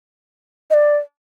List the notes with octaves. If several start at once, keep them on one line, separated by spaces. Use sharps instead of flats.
D#5
D5